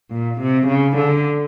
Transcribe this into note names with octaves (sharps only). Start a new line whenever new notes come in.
A#2
C3
C#3
D3